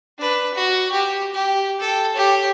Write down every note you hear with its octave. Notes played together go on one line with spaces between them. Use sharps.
D4 B4
F#4
G4
G4
A4 G5
G4 C#5